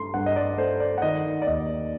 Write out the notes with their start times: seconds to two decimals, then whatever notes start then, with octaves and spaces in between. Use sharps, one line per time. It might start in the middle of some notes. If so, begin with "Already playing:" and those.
Already playing: G2 A3 C6
0.14 G2 F#5
0.26 D#5
0.36 D5
0.58 A3 C5
0.80 D5
0.98 F#5
1.02 D#3 D#5
1.42 D5
1.47 D#2 D#5